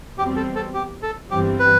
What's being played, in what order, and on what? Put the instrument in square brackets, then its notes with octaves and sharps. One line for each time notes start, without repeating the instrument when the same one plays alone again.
[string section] E2 B2 G3 C4 [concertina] G4
[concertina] A4
A4
G4
A4
[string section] G1 G2 E3 G3 C4 [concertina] G4
[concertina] B4